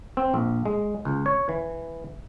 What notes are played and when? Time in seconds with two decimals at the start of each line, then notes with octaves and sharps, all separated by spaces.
0.17 C4
0.34 A#1
0.66 G#3
1.05 C#2
1.26 C#5
1.49 E3